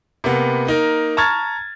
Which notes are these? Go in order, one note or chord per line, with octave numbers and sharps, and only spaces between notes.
C3 A#3 B3
A#3 D#4 A#4
A5 A#5 C#6 F6 G#6 A6